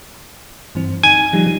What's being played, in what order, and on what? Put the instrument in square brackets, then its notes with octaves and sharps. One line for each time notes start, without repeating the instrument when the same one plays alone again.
[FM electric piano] G2 E3 C4
[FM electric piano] D#4 [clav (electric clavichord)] G#5
[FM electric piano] F3 G3 D#4